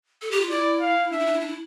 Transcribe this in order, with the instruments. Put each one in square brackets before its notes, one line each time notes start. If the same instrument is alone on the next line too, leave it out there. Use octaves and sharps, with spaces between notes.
[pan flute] A4
G4
F4
[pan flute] E4 [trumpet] D5
[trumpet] F5
[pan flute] D4 [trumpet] E5
[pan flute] E4
D4
E4
D4
E4